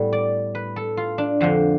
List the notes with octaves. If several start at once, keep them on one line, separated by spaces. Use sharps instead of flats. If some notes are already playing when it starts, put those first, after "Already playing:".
Already playing: A2 G3 B3
D5
B4
A4
F4
D4
F2 D3 F3